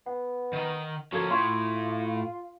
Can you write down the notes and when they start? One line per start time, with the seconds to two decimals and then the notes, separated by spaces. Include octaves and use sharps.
0.06 B3 F#5
0.53 D#3 D#5
1.12 F3 A#3 C#4 F#4 A4 G#6
1.31 A2 F4 C6 C#6 G#6